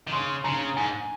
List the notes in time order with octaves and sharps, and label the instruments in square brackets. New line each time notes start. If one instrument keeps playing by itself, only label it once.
[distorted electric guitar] D#3
[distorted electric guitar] C#3 [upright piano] C6
[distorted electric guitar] C#3 [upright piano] A#5
[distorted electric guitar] G#2 [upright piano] G#5